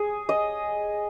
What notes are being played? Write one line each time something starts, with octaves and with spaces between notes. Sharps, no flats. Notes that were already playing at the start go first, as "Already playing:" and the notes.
Already playing: G#4
D#5